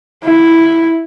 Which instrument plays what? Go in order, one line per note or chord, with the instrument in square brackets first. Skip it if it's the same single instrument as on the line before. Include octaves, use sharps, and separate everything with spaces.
[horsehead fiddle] E4